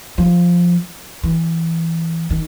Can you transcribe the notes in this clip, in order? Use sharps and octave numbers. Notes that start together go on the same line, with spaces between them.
F3
E3
D#3